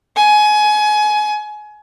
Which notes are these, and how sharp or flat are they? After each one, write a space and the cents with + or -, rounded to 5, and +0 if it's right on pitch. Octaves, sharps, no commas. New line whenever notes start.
G#5 +25